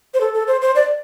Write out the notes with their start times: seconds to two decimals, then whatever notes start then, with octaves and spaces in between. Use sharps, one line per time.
0.14 C5
0.21 A4
0.34 A4
0.47 C5
0.62 C5
0.75 D5